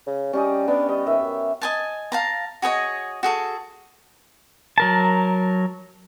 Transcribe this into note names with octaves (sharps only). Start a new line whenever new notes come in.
C#3
G3 C#4 G4 D#5
B3 D4
G3 D#5
D#2 E5
F#2
D#5 G#5 A5
F5 A5 A#5
F#4 G#4 C#5 D#5
F#4 G#4 A4
F#3 A#4 A5